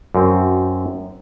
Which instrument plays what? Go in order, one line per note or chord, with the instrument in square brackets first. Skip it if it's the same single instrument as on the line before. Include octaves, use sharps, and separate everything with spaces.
[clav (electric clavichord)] F#2 C4